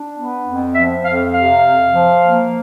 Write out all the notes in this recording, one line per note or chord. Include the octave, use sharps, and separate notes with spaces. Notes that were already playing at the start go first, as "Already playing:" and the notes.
Already playing: D4
B3
F2
F3 E5
F2 F5
C3 F5
F2
F3
A#3